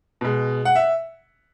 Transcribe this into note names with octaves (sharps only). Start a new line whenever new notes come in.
B2 G#3
F#5
E5